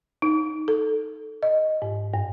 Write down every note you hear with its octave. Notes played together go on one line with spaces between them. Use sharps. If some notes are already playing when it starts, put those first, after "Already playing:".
D#4
A4
D#5
G#2
G2